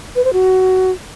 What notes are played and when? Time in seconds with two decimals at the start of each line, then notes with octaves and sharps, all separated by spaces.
0.16 B4
0.24 C5
0.33 F#4